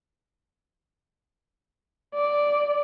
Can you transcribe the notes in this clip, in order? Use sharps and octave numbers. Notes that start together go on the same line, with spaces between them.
D5